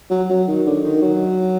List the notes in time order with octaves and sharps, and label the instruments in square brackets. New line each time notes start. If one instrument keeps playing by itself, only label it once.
[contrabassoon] F#3
F#3
D#3
D3
D#3
F#3